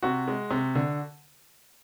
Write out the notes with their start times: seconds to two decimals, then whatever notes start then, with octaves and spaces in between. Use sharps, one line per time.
0.03 C3 F#4
0.28 G#3
0.51 C3
0.75 D3